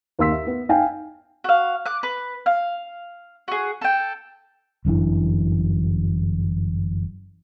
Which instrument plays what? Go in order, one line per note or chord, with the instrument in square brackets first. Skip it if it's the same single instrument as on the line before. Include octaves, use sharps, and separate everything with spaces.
[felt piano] D#2 F5 C6 E6 B6
E5
B3
D#4 F5 G5 G#5
[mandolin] F#4 F5
D6 F#6
B4
F5
F#4 G#4
A4 G5
[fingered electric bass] G1 F#2 E3 D4